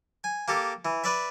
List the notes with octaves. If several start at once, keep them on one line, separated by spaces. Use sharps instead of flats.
G#5
A#3 G4 A4
E3
B4 D5 E5